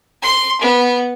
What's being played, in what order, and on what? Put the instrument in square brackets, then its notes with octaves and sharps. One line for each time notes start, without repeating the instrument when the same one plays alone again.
[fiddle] C6
B3